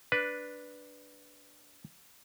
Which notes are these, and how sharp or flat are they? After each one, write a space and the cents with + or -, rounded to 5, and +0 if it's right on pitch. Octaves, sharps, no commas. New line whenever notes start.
D4 +0 B4 +0